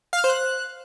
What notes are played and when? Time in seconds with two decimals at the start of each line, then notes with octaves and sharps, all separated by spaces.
0.13 F5
0.18 F6
0.24 C5
0.29 F#6